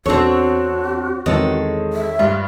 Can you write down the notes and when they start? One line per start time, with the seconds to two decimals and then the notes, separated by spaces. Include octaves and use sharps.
0.06 E2 C4 D4 F#4 A4 C#5
1.26 E2 D#3 E3 G#3 C4 A4 C#5
1.93 E5
2.19 G2 F4